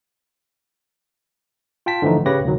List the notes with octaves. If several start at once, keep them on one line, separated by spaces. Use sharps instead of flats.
F4 G5 A5 B6
D3 E3 F3 A3 D#4
C#3 G4 B4 C#5 A#6
D2 C3 D#3 F#3